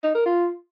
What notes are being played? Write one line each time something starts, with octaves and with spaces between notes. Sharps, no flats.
D#4
A#4
F4